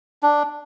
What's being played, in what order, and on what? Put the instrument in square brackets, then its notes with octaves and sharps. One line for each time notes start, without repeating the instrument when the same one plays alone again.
[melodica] D4